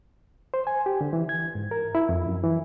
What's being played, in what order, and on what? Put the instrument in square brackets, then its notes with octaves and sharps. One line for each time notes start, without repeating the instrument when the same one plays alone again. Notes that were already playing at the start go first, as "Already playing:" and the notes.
[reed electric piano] C5
G#5
G4
D3
E3
G#6
G#2
A#4
E4
F2
F#2
E3